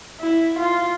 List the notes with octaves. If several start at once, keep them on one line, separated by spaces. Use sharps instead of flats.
E4
F4